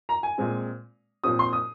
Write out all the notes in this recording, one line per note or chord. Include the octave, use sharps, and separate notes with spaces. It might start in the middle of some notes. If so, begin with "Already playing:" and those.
A#5
G#5
A#2 G#3 C4
A#2 F3 C4 D#6
C6
D#6